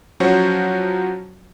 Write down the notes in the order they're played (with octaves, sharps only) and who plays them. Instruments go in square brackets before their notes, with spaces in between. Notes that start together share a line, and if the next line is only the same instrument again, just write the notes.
[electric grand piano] F3 F#3 C#4 F#4 C5 C#5